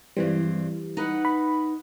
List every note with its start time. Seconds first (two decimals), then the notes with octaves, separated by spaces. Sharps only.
0.17 G2 E3 G3 G#3 C4
0.97 D#4 B4 F#5
1.25 B5